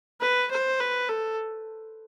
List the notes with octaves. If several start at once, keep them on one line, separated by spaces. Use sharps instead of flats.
B4
C5
B4
A4